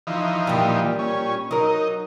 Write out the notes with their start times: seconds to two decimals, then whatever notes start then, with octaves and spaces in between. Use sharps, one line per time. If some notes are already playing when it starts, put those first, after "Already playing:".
0.07 E3 F3 D#4
0.47 A#2 G3
0.99 C#4
1.51 F#3 D#4 A#4